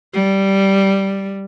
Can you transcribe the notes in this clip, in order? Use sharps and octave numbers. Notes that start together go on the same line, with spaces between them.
G3